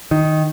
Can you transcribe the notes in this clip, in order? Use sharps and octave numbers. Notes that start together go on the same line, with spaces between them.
D#3